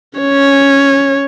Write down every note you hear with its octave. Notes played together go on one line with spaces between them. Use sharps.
C#4 C#5